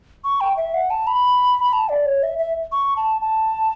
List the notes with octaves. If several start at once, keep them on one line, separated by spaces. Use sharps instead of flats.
C#6
G5
E5
F#5
A5
B5
B5
A5
D5
C#5
E5
E5
C#6
A5
A5